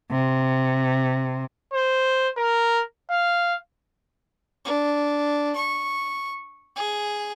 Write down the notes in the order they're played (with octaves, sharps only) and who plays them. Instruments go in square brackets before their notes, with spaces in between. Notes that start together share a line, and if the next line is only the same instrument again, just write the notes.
[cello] C3
[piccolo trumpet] C5
A#4
F5
[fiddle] D4
C#6
G#4